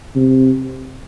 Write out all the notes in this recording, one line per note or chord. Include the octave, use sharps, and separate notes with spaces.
C3